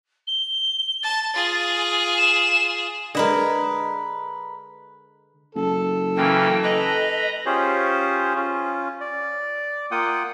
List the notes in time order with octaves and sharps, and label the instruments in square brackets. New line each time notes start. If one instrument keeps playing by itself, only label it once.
[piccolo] G7
[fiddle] A5 [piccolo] A6
[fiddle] F4 G#4
[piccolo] E7
[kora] D3 G#3 [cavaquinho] A#4 B4 D#5
[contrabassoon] F#1 [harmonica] A4
[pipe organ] C#3 E3 A#3 [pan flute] G5
[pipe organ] B4 A#5 [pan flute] D#5
[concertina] C#4 F4 G4 G#4 C5 C#5
C#4 F4
D5
A#3 F4 F#5 G5 D#6